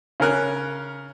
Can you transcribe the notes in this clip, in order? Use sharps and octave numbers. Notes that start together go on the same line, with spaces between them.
C#3 C#4 A#4 F#6